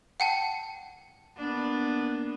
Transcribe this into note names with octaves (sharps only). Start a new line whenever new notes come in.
F#5 G5 A5
A#3 B3 D4